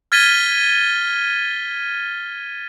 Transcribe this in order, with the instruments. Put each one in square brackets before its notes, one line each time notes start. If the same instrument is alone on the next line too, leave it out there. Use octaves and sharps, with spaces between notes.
[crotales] F6 G#6 A6 B6 D#7 G7